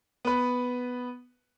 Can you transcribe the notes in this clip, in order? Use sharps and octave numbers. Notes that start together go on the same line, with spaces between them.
B3 B4